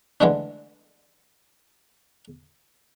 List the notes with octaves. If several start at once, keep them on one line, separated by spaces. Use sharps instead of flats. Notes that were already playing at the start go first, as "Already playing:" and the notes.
D3 E3 G#3 A3 D4